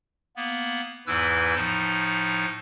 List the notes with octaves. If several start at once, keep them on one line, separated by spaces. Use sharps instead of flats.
A#3 B3
E2 G#2 E3 E4 B4 E6
A2 F3 D#4